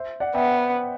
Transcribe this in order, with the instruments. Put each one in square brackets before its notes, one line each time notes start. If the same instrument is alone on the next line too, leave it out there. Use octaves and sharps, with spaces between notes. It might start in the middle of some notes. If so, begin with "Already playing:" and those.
Already playing: [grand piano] C5 E5
D5 F#5
[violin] B3 [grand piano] E5 G5